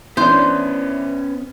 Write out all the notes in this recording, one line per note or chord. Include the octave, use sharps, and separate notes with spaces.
E3 B3 C#4 D4 C5